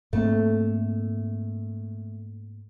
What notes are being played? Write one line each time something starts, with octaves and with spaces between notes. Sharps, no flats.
G#2 A3 A#3 C4